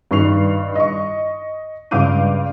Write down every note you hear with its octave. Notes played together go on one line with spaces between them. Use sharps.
G2 D#3 C#6 C7 F7
D#5 C#6
C#2 G2 F5 D6 G6 D#7